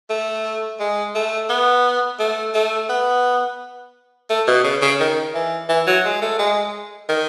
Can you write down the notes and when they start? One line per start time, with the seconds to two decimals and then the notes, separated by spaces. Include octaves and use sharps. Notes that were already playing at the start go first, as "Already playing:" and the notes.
0.10 A3
0.80 G#3
1.15 A3
1.50 B3
2.19 A3
2.55 A3
2.89 B3
4.30 A3
4.48 B2
4.64 C#3
4.82 C#3
5.00 D#3
5.34 E3
5.69 E3
5.87 F#3
6.05 G#3
6.22 A3
6.39 G#3
7.09 D#3